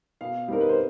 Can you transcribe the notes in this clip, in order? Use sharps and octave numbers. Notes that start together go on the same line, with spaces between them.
B2 F5
G3 C4 D#4 A#4
B4
C5